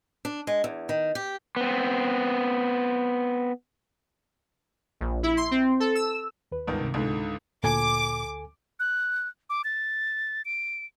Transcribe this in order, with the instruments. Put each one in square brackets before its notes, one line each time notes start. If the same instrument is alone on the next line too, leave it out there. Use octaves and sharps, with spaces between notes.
[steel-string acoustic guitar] D4
G#3
E2
D#3
G4
[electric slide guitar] B3 C4
[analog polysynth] A#1
E4
C6
C4
A4
E6
[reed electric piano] D#2 B4
[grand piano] G1 C#2 D#3
[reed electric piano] C3
[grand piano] C#2 G#2 D3
[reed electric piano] D2 A4 G#5 [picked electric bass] A#2 [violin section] D6
[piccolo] F#6
D6
A6
D7